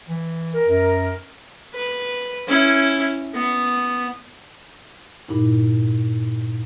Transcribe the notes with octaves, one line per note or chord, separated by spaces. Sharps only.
E3
A#4
F#2
B4
C#4 E4
B3
G2 A#2 D#4 E4